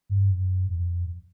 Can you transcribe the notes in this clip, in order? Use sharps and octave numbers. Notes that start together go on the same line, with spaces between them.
G2
F#2
F2